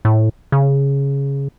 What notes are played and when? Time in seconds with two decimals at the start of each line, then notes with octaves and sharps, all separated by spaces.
0.05 A2
0.52 C#3